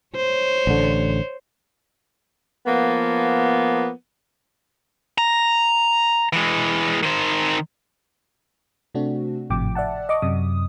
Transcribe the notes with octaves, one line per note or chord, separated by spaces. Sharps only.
C5 C#5
A1 D3
F3 A#3 B3
A#5
E3 G#3
D#3 C5
C3 A3 C4 D4 F#4
G#1 A2 C3 F3 G5 D6
D5 E5 F#5 A5
D#5 C#6 D6
F#2 C3 D#6